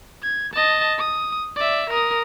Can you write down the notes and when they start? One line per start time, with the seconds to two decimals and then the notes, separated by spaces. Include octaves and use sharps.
0.23 G#6
0.54 D#5 A5
0.99 D#6
1.57 D5 E5
1.90 A#4 D#6